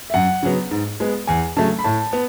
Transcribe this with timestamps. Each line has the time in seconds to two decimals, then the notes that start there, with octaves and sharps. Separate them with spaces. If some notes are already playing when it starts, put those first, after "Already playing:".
0.10 E5
0.14 F#2 F#5
0.43 C#3 F#3 B3
0.71 G#2
1.00 G#3 B3
1.27 E2 G#5
1.56 C#3 F#3 A3 A5
1.79 B5
1.84 A2 A5
2.13 B3